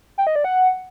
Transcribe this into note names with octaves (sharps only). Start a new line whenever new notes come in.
G5
D#5
D5
F#5